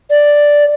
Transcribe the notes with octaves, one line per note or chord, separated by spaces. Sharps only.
D5